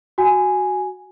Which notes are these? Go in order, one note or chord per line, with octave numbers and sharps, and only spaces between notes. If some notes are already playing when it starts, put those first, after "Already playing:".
F#4 G#5